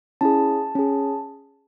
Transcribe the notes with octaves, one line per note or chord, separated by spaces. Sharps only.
C#4 E4 G#4 A5
C#4 G#4